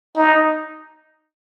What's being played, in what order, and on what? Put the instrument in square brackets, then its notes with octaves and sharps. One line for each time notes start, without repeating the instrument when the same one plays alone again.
[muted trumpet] D#4